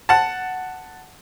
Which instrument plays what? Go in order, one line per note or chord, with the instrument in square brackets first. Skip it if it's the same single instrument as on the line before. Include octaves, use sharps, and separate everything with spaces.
[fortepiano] F#5 A5